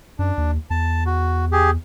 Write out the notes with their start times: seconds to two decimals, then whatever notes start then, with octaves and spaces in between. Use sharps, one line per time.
0.19 F#2 D4
0.38 D#2
0.70 E2 A5
1.06 F#4
1.52 G4 G#4